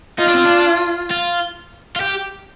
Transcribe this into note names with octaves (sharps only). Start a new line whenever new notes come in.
D#4 F4
D4
C4
D4
F4
F4
G4